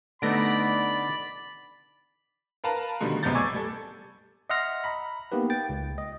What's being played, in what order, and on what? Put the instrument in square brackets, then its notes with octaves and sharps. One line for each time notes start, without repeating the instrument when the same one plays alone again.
[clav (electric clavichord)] D3 B3 D#4 [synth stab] A3 A#6 D7 [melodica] D5 [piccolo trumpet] B5
[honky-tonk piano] A#4 B4 F5 A5 A#5
B2 D3 D#3 G3
C#2 F#2 C3 B3 G6 A6
D5 G#5 C#6 D6 E6 G#6
G3 A4
[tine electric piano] D#5 E5 F#5 C6 F6 A#6
A#5 B5
A#3 B3 D#4 G4 B4
G5 A6
C#2
D#5